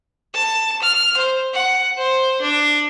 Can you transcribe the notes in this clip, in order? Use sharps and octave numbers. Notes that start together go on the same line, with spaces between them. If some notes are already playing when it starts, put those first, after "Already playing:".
A5
F6
C5
F#5
C5
D4